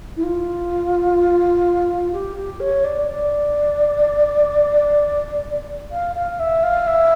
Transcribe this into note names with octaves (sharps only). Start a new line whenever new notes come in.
E4
F4
G4
G4
C#5
D5
D5
F5
F5
E5
F5
E5